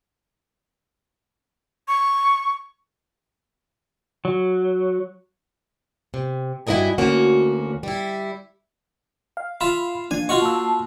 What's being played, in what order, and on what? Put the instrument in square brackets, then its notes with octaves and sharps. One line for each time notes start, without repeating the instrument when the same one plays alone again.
[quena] C#6
[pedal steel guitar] F#3
[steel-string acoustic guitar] C3
G2 E4 F#4 A#4 D#5 G#5
D2 A#3 C#4 F#4
G3 E4
[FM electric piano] F5
[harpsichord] F4 E5 [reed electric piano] B5
[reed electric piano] F3 A#3 D4 [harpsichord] G#5
[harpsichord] F4 F#4 C#6 [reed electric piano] D#5
[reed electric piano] A#3 E6 [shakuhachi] A5